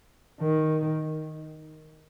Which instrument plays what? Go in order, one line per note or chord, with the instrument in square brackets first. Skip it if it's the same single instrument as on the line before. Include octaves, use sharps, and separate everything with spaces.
[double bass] D#3